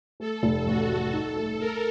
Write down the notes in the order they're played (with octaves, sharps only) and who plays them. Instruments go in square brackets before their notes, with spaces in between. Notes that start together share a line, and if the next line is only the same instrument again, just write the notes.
[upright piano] A3 [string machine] A4
[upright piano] F1
[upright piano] A1 [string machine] F#4
[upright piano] A3
[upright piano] D#4 [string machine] A4
[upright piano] A3
[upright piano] A3 [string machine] A#4